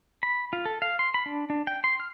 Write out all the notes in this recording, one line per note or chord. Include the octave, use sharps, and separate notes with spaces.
B5
F4
A4
F5
C6
B5
D4
D4
G5
C6
F6